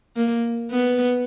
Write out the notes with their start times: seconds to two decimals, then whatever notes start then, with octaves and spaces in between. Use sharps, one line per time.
0.16 A#3
0.71 B3